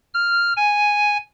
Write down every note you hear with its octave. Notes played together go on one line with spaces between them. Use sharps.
F6
G#5